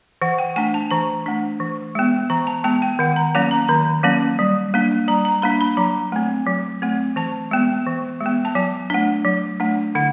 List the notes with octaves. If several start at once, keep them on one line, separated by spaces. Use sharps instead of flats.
E3 F#5
G5
A3 D4 G#5
A5
E3 A#5
A3 D4
E3
G#3 B3
E3 A#5
A5
G#3 B3 A5
G5
D#3 F#5
A#5
F#3 A#3 C#4 A5
A#5
D#3 A#5
F#3 A#3 C#4
G3
A#3 D4
G3 A#5
A#5
A#3 D4 B5
B5
F#3 A#5
A3 C4
F#3
A3 C4
E3 A5
G#3 B3
E3
G#3
B3
A5
F#3 G#5
A3 D4
F#3
A3 D4
D3 F#5